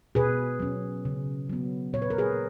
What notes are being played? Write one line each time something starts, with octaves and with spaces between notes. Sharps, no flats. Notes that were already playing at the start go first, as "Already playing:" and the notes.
B2 G#4 B4
F#3 C#4
C#3
F#3 B3
A#2 C#5
B4
A#4
G#4 B4